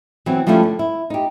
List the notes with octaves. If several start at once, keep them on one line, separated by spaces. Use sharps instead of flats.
E3 F#3 B3 C4
F3 G3 A3 C#4 E4 F4
D3
E4
D#4 G4